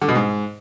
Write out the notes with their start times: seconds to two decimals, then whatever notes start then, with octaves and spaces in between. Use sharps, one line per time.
0.02 D3
0.08 B2
0.15 G#2